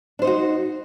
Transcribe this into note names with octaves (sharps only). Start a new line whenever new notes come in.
D4 D#4 F#4 C5